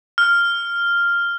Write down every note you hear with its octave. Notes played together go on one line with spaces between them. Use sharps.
F6